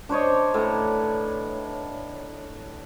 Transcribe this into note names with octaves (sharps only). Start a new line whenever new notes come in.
D4 C5 C#5 D#5
A2 B4 A#5